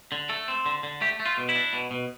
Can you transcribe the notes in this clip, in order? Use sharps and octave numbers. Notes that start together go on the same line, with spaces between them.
D3
A3 A4
C4
D3
D3
A3 G4
A3
F4
B2
E4
D4
B2
B2